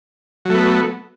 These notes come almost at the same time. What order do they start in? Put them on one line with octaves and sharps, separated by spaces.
F#3 A3 B3